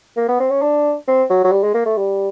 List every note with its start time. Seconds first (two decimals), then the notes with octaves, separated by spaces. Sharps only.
0.17 A#3
0.28 B3
0.40 C4
0.51 C#4
0.62 D4
1.08 C4
1.30 F#3
1.44 F#3
1.52 G3
1.63 G#3
1.74 A#3
1.86 A3
1.97 G3